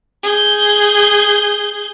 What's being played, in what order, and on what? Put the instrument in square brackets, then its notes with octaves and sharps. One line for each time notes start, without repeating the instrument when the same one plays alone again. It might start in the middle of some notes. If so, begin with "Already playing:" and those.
[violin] G#4 G6